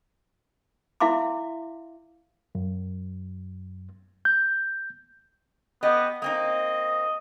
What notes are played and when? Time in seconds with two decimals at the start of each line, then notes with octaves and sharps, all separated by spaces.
1.00 E4 E5 F5 C6 D6
2.55 F#2
4.25 G6
5.83 B3 G4 D#5
6.22 A#3 C4 D#4 D#5